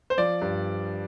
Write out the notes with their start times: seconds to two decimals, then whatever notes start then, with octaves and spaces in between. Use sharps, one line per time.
0.10 C5
0.17 F3 D5
0.42 G2